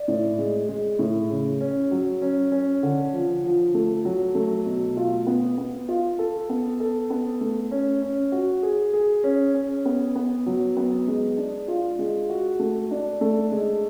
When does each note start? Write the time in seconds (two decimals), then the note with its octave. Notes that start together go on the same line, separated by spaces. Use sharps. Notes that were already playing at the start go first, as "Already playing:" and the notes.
Already playing: D5
0.08 A2
0.38 G#3
0.69 G#3
0.99 A2
1.30 C#3
1.61 C#4
1.91 F#3
2.22 C#4
2.52 C#4
2.83 D3
3.13 F3
3.44 F3
3.74 A3
4.05 F#3
4.35 A3
4.66 B2
4.97 F4
5.27 B3
5.58 B3
5.88 F4
6.19 A4
6.49 B3
6.80 A4
7.10 B3
7.41 A3
7.71 C#4
8.02 C#4
8.32 F#4
8.63 G#4
8.93 G#4
9.24 C#4
9.54 C#4
9.85 B3
10.15 B3
10.46 F#3
10.77 B3
11.07 G#3
11.38 D4
11.68 F4
11.99 G#3
12.30 F#4
12.60 A3
12.91 D4
13.21 A3
13.52 G#3